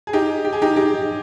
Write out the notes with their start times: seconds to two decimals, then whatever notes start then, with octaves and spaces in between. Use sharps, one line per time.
0.07 G#4
0.13 D#4 G4
0.45 G4
0.53 G#4
0.62 D#4 G4
0.76 D#4 G4